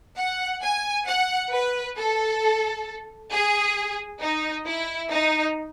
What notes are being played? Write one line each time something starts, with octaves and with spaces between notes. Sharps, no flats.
F#5
G#5
F#5
B4
A4
G#4
D#4
E4
D#4